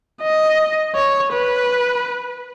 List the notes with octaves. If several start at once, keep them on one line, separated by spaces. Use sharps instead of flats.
D#5
C#5
B4